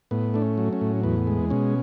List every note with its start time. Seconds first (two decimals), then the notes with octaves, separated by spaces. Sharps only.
0.11 A2 B3
0.34 A3 D4
0.42 C#4
0.58 F#3
0.73 C#4
0.81 A2
1.03 E2 B3
1.27 G#3
1.50 B2 C#4